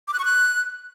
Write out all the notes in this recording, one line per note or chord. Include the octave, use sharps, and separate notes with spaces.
D6
F#6
C#6
F#6